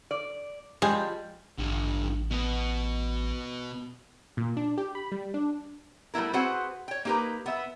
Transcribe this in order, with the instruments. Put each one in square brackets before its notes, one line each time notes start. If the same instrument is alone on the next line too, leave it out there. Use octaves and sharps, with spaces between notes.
[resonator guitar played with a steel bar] D5
[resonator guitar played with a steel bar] F3 G3 [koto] G#3
[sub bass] A1 [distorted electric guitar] G2 D3
[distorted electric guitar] B2 B3
[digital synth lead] A#2
D4
G4
B5
G3
D4
[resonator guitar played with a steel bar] G3 A3 B3 E4 A#4
C4 F#4 G#4 B4 C5 F#5
C#5 G5
A#3 D#4 G4 A#4 B4
B3 E5